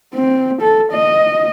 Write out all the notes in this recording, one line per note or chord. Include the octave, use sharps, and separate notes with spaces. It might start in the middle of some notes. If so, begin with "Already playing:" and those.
C4
A4
D#5